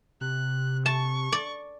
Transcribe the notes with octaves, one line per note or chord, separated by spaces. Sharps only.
C3 F#6
A5 C#6
D5